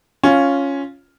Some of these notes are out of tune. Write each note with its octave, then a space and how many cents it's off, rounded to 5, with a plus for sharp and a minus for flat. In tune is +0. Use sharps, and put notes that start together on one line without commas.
C#4 +0 F4 +0